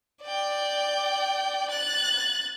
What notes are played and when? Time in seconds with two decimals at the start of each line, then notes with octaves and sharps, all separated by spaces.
0.23 D5 G5
1.70 F#6 A6